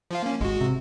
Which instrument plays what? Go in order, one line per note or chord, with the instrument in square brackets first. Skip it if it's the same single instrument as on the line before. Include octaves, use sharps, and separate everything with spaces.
[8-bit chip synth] F3 F4 F5
A#3 C#4
[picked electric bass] G#1 [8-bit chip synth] G#3 F#4
[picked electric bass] C3